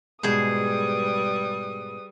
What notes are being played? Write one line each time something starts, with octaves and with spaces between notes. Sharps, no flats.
G#2 B2 G3 G#3 G#4 B4 C5 D#6